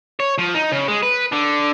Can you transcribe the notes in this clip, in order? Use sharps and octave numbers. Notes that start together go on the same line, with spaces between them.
C#5
F3
D#4
C#3
G#3
B4
D3